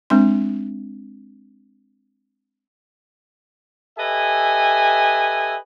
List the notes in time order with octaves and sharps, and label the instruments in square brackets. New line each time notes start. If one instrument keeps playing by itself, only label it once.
[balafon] G#3 C4 D4 C6
[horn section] G4 A4 B4 D#5 E5 G#5